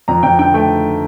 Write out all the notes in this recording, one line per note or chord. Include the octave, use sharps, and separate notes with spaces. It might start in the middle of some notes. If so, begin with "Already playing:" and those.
F2 A#5
F2 G5
D3 G5
A3 G5